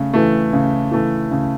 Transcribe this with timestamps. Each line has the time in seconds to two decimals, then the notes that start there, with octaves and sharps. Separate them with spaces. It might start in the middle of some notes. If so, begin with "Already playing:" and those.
Already playing: C#3 A3
0.14 E3 A3
0.53 C#3
0.92 E3 A3
1.31 C#3